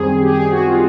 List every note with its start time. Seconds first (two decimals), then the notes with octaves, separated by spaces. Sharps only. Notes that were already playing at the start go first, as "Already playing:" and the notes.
Already playing: F#2 D#3 G3 C4 G#4
0.21 G4
0.29 G#4
0.51 F#4
0.67 F4